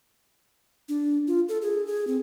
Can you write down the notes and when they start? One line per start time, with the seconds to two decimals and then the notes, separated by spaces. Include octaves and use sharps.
0.89 D4
1.28 F4
1.49 A4
1.62 G#4
1.87 G#4
2.07 C4